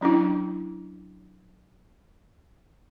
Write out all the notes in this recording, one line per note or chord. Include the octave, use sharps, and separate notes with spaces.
F#3 C#4 D4 E4